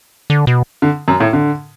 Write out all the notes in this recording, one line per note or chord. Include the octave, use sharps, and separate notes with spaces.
D3
B2
D3
F#2
A2
D3